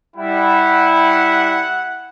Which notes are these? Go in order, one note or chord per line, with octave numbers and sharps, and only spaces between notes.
G3 E4 F#5